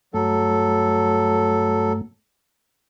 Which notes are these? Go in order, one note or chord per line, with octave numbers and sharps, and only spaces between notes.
G2 F#3 A3 A4